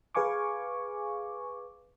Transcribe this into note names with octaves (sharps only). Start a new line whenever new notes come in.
G#4 B4 F5 G#5 C#6 D6